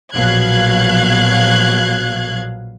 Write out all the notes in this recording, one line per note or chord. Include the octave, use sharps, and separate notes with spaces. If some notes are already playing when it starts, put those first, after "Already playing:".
A#1 B2 F#3 F5 F#6 G#6